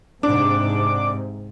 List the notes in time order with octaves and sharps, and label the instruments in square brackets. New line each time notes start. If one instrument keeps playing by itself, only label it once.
[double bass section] G#2 C3 [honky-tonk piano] D4 [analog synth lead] D6